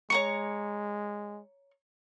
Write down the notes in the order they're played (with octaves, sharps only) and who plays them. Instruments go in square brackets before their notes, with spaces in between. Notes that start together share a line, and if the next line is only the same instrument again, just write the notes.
[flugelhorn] G#3 [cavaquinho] C#5 A#5 C#6 [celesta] C#7